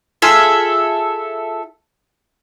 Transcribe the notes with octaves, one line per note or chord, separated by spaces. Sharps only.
F4 G#4 A4 E5